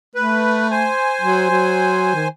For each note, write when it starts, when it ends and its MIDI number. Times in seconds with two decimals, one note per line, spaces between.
0.15 0.91 57
0.15 0.68 71
0.71 2.28 72
0.71 2.28 80
1.21 1.49 54
1.50 2.13 54
2.15 2.28 51